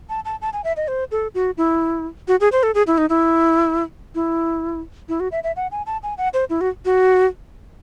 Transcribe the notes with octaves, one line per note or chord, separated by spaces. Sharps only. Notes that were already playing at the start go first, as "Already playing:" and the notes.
A5
A5
A5
G#5
E5
D#5
C5
A4
F#4
E4
F#4
G#4
C5
A4
G#4
E4
D#4
E4
E4
E4
F#4
E5
E5
F#5
G#5
A5
G#5
F#5
C5
E4
F#4
F#4